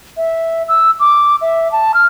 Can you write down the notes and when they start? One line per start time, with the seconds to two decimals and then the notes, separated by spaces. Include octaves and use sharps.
0.17 E5
0.68 E6
1.00 D6
1.41 E5
1.72 A5
1.94 F6